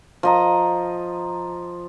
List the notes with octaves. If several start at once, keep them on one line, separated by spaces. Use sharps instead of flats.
F3 D#5 A#5